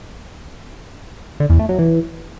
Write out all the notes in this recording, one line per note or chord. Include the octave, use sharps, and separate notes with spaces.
D3
E2
A3
F#3
E3